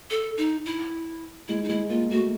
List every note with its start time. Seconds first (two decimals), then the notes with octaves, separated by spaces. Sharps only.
0.10 A4
0.37 D#4
0.66 E4
1.48 G#3 E4
1.64 D#4
1.68 G#3 E4
1.89 A#3 F4
2.10 A3 F#4